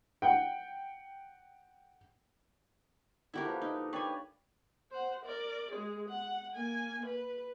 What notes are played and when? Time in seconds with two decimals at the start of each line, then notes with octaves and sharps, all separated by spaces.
0.22 F#5 G5
3.34 D3 D4 E4 F#4 G4 A#4
3.45 F3 A#3 B4
3.62 D#4
3.76 A#4
3.93 G4 B4 C#5 D5 G#5
4.91 C5 F#5
5.25 A#4 D5
5.71 G#3 G#4
6.08 F#5
6.55 A#3 G#5
7.06 B4